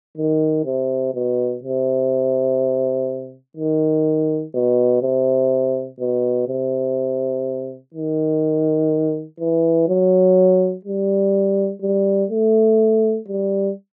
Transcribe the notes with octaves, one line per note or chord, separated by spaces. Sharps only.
D#3
C3
B2
C3
D#3
B2
C3
B2
C3
D#3
E3
F#3
G3
G3
A3
G3